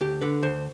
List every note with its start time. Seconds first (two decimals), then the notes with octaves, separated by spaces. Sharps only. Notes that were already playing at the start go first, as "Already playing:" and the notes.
0.01 D2 G4
0.21 D3 B4
0.43 D2 C5